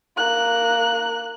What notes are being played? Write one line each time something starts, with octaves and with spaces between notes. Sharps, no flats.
A#3 F#6